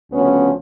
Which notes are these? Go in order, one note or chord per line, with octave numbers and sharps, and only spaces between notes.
D2 C#3 F3 B3 C#4